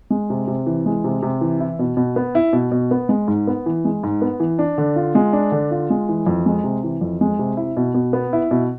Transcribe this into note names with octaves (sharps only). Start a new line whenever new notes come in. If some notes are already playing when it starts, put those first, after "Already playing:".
G#3
C3
C3
E3
G#3
C3
C3
E3
E4
B2
B2
B3
E4
B2
B2
B3
G#3
G#2
B3
E3
G#3
G#2
B3
E3
D4
D3
F4
G#3
D4
D3
F4
G#3
E3
F2
G#3
C3
E3
F2
G#3
C3
E4
B2
B2
B3
E4
B2